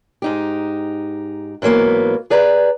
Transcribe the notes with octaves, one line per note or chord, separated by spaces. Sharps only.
G#2 D#4 G4
G#2 E3 F#3 A#3 B3
G#4 B4 D5 A#5